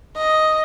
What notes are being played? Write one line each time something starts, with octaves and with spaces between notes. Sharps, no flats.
D#5